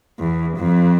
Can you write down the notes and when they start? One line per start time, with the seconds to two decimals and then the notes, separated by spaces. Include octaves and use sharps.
0.19 E2
0.57 F2